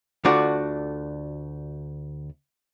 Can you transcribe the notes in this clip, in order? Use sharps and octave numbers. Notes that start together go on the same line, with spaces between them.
D2 A3 D4 F4 F#4 D5